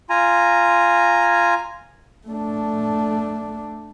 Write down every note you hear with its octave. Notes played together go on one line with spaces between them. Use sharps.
F4 G#5 A#5
A3 D4